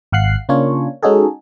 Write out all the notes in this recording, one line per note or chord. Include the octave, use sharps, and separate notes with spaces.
G#1 F5 F#5 F#6 C7
C#3 A#3 C#4 D4 F4 C#5
G#3 C#4 D#4 F#4 G#4 A4